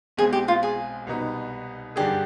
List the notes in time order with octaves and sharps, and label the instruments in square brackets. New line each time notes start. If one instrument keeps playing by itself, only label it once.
[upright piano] B1 B2 G#3 C4 [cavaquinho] G#4
[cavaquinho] G4
F4
G#4
[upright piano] C2 B2 B3 D#4
[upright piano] G2 D3 G3 D4 G#4 [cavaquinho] G4